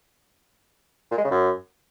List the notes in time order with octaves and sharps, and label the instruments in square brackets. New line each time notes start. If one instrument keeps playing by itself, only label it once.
[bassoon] A#2
G#3
C#3
F#2